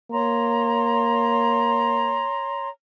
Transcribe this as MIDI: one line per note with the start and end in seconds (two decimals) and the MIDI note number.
0.11 2.27 58
0.11 2.67 73
0.11 2.67 82
0.11 2.67 84